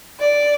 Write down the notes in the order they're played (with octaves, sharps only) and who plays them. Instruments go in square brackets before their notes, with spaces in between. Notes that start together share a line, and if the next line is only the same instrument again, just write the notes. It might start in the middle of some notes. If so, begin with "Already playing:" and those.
[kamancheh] D5